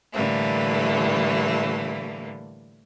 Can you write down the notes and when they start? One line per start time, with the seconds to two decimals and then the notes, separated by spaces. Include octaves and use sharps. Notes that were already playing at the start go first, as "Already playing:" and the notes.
0.13 A2 D3 E3 G3 A3 A#3